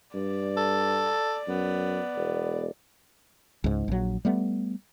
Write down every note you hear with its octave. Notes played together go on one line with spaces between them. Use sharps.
G2 D5
A4
F#2 B3
E1
C#2 G#2
A#1 F#3
G3 A3 B3